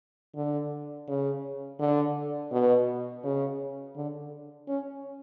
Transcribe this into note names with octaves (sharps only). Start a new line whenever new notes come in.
D3
C#3
D3
B2
C#3
D3
C#4